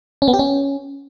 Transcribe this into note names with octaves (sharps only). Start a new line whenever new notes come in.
C#4
B3
G4
C#4